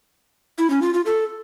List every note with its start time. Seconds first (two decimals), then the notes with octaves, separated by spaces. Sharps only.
0.58 E4
0.70 C#4
0.82 F4
0.94 F4
1.06 A4